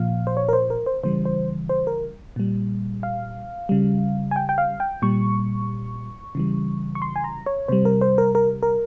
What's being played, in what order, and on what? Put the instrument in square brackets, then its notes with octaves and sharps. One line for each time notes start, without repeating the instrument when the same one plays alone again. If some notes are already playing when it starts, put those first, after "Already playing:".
Already playing: [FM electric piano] A#2 F3 F5
C5
C#5
A#4
C5
A#4
C5
C#3 E3 G3 C5
C5
C5
A#4
A#2 G3
F5
C#3 G3
G#5
G5
G5
F5
G5
A#2 G3 C#6
C#3 E3 G3
C#6
C6
G#5
A#5
C#5
C3 G3 C5
A#4
C5
A#4
A#4
A#4